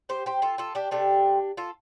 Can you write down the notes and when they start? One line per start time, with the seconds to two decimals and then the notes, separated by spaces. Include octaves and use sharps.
0.09 G4 C5
0.26 G4 C5
0.42 F4 A4
0.58 F4 A4
0.75 D4 G4
0.91 C3 A3 D4 G4
1.57 F4 A4